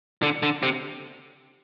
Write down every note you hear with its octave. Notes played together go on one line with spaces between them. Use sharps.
D3
D3
C3